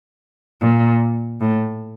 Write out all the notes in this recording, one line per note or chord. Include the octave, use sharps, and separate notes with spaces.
A#2
A2